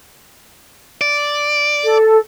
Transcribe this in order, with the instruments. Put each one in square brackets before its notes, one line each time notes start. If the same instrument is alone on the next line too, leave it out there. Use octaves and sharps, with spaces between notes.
[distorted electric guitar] D5
[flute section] A4